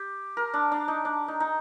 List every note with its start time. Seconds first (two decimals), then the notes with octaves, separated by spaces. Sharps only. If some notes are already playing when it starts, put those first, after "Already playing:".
Already playing: G4
0.37 A#4
0.54 D4
0.72 D4
0.88 D#4
1.05 D4
1.28 D#4
1.40 D#4